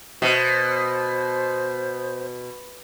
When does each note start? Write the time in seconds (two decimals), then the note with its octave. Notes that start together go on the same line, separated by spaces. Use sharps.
0.22 B2 C5